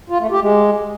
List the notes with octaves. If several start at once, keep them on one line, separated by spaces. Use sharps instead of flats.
F4
A3
G4
G#3